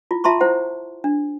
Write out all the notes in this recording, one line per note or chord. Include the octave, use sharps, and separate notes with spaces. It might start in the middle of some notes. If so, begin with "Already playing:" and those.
E4 F4
F4 E5 A5 A#5 C6 C#6
E4 C5 F#5
D4